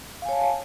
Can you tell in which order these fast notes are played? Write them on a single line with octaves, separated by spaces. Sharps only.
F5 G#5 C#5 A5